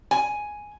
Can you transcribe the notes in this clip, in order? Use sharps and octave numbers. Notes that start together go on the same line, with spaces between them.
G#5